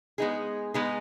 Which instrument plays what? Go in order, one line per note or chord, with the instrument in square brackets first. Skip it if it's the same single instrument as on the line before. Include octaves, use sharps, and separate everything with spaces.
[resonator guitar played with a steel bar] G#3 B3 D#4 G#4
G#3 B3 D#4 G#4